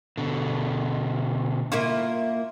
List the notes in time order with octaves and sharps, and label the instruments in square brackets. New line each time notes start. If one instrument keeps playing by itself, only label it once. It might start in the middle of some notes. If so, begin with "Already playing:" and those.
[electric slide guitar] B2 D3
[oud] A#3 E4 F4